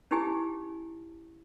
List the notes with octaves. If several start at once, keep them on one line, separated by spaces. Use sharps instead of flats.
C#4 D#4 E4 G4 G#4 G#5